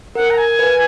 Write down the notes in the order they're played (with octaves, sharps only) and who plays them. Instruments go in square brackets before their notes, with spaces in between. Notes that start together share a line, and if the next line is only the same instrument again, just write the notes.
[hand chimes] A#4 [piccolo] F#5
[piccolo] A#5
G#5
[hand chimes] B4